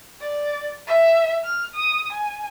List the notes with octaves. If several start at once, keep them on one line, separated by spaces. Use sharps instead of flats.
D5
E5
F6
D#6
G#5